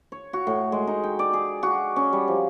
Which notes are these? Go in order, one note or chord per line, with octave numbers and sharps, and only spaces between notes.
C#5
F#4
A2
G#3
D#4
G5
D5
G#4
F#4
C#4
G3
F3